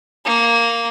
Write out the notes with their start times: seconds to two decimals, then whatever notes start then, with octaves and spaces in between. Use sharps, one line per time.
0.25 A#3